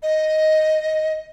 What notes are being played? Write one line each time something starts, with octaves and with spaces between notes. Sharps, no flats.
D#5